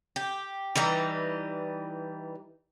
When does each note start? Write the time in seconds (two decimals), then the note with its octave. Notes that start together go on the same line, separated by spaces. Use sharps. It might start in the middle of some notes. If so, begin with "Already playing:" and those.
0.16 G4
0.75 E3 G3 D#4 A#5